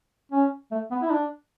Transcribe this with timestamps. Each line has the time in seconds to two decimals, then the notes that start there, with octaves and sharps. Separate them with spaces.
0.31 C#4
0.71 A3
0.91 B3
1.02 E4
1.11 D4